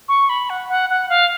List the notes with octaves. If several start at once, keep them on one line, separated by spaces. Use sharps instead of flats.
C#6
B5
F#5
F#5
F#5
F5